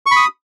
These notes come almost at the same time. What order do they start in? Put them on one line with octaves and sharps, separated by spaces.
C#6 B5 D#6